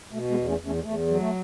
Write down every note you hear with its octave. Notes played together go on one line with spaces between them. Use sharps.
B2 A3
G#3 B3
E2
A3 C#4
E2
A3 C#4
G#3
E2 A3
F#3
A3